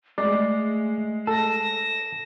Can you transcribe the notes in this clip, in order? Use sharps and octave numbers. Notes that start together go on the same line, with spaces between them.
G#3 A3 D5
A4 A#6 E7